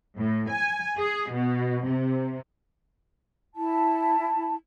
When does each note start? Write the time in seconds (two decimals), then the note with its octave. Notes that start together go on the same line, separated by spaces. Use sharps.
0.18 A2
0.48 G#5
0.99 G#4
1.32 B2
1.87 C3
3.55 E4 A5